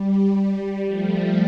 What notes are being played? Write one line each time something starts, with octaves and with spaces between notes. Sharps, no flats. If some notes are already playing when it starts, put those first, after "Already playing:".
Already playing: G3
G3
F3 A3